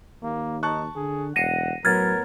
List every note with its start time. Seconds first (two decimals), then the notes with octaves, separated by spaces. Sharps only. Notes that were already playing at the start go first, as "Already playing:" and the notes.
0.23 D#2 A#3
0.63 D#4 A5 C#6 F#6
0.96 D3 G#4
1.36 E1 F#5 A#6 C7 C#7 D#7 E7
1.85 A2 F#3 B3 A#4 F6 G#6 A6